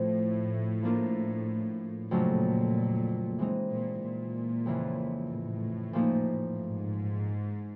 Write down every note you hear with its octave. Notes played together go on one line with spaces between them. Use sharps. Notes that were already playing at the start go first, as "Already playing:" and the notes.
Already playing: A2 F3 A3 C4
F3 A#3 D4 F4 A#4
F2 A#2 C#3 F#3 A3 D4
E3 G#3 C4 D#4
A#2
A#2
F2 C#3 E3
A2
A#2 F3 A#3 D#4
G#2